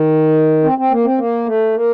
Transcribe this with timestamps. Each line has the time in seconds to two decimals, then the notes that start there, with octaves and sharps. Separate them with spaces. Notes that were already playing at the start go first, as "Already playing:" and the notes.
Already playing: D#3
0.64 C4
0.78 C4
0.91 A#3
1.05 C4
1.18 A#3
1.46 A3
1.75 A#3